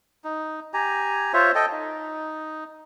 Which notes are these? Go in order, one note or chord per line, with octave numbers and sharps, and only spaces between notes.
D#4
G4 G#5 A#5
F4 C5 C#5 E5
A4 D#5 G5
D#4